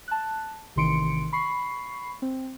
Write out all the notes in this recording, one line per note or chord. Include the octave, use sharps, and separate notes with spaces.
A5 F#6
A1 C3 D#3 C6 C#7 D7
B5 C#6 C7
C4